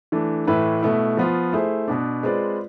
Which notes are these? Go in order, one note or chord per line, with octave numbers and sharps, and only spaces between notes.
E3 A3 D4
A2 E3 A3 E4 B4
B2 A3 E4
F3 B3 F4
A3 E4 G#4 C5
B2 B3 D4
G#3 C4 F4 B4 D5